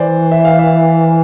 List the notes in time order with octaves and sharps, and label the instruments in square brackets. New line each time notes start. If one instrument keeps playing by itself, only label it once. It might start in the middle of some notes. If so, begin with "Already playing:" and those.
Already playing: [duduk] E3 [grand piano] C5 D5
[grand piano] E5
F5
E5